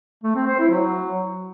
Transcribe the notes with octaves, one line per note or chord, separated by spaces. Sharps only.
A3
C4
C5
E4
F#3